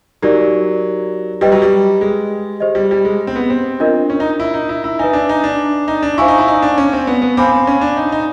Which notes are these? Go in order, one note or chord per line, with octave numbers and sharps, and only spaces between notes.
F#3 D#4 G4 A#4 D5
G3 G4 B4 D#5 G5
F#3
G3
G#3
G4 C5 D#5
G3
G3
G#3
C4
B3
C4
D4 F4 A#4 D#5
C#4
D#4
E4
D#4
E4
E4
D#4 B4 E5 G#5
D4
D#4
D4
D#4
D4
E4 C5 F5 G#5 C#6
D#4
E4
D#4
D4
C#4
C4
B3
B3
C4 C5 F5 G#5 B5 D6
C4
C#4
D4
D#4
D#4